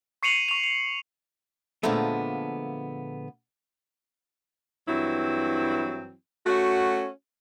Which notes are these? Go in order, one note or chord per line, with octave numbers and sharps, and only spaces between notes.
C#6 C7 C#7 D#7 F7 F#7
C#6 F7
F7
A#2 D3 F3 G#3 A3 B3
G2 E3 F#3 C4 E4
A3 C#4 F#4